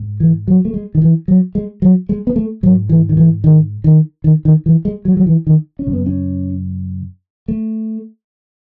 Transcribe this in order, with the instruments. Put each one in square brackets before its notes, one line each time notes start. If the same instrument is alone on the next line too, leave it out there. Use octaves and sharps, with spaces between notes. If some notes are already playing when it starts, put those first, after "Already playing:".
Already playing: [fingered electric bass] G#2
E3
F#3
A3
G#3
D#3
E3
F#3
G#3
F#3
G#3
B3
A3
G#2 F#3
E3
D#3
E3
D#3
D#3
D#3
D#3
E3
G#3
F#3
F#3
E3
D#3
C#4
F#2 C#3
B3
C#4
A3